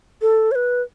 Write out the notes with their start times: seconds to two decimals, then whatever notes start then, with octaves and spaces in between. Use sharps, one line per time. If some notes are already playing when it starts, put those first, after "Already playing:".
0.22 A4
0.52 C#5
0.55 B4